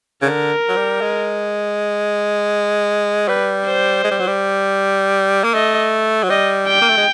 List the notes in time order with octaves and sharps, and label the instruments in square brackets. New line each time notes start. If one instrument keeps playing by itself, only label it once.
[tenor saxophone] C#3
[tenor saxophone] D3 [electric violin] A#4
[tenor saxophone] F#3
G3
G#3
[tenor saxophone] G3 [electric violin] B4
[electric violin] C5
[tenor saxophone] G#3
G3
F#3
G3
A#3
[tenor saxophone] A3 [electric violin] D#5
[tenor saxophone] F#3
[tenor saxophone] G3 [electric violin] D#5
[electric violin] G5
[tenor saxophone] A#3
A3
G#3